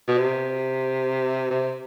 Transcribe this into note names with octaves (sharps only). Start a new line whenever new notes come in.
B2
C3
C3